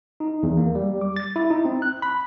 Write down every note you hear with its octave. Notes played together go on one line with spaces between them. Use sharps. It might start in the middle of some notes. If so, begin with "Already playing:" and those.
D#4
E2
A#3
G3
D6
A6
E4
D#4
C4
F#6
B5